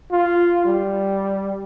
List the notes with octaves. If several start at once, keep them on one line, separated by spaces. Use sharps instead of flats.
F4
G3